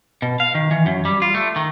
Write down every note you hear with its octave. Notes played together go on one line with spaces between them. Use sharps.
B2
F5
D#3
E3
F#2
G3
F4
A3
D#3